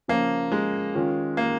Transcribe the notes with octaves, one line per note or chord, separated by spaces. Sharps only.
C#3 F3 A#3 C#4 F4
G#3
D#3 C#4 F4
A#3